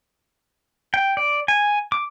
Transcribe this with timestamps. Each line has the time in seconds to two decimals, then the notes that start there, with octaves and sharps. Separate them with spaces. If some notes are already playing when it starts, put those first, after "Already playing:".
0.94 G5
1.17 D5
1.48 G#5
1.92 D6